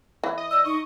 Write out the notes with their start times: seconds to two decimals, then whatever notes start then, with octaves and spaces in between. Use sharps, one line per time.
0.24 E3
0.38 D#5
0.51 D5 D#5 E6
0.65 D#4 D#5 C#6